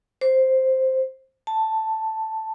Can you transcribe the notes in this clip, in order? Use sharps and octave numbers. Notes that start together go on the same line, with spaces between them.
C5
A5